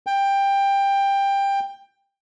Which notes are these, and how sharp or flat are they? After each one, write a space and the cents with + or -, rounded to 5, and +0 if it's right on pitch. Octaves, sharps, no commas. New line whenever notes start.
G5 +15